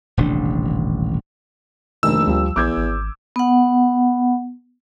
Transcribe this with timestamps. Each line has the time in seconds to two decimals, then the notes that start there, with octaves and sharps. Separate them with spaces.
0.17 D#1 A1 C3 D4
2.03 F1 A#1 D#3 E6
2.27 D2 F3 G3
2.56 A#1 E2 D6 G6 G#6
2.77 G#1
3.36 B3 F#5